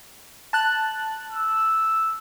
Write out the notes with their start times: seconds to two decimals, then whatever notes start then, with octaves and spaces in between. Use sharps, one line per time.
0.53 A5 F#6
1.31 E6